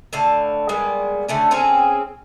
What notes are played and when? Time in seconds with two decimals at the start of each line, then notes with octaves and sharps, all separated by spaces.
0.13 A2 D3 F5 A5
0.69 G3 G#3 A#3 B3
1.28 D3 A3 C#4
1.51 C4 C#4 G#4